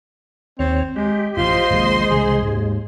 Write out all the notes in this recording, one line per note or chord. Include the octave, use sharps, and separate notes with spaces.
D#2 C4 C#5
G#3 G4
A1 F#2 F4 C5 D#5 C6
D#1 A#1 C3 G#3
C2 C#3 E3 G#4
D#2 G#2